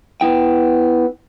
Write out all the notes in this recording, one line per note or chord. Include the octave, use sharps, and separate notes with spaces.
B3 E4 G5